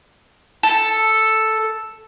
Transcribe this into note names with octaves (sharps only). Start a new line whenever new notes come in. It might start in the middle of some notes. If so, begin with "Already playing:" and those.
A4